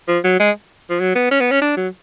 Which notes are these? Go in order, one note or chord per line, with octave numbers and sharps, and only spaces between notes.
F3
F#3
G#3
F3
F#3
B3
C#4
B3
C#4
D4
F#3